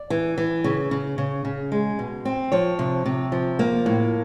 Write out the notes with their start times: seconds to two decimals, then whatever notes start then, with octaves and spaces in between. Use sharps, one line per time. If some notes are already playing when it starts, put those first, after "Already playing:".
Already playing: D5
0.10 E3
0.38 E3
0.64 C#3
0.91 C#3
1.18 C#3
1.45 C#3
1.72 G#3
1.99 B2
2.25 C4
2.52 F3 C#5
2.79 C3
3.06 C3
3.32 F3
3.59 A#3
3.86 A2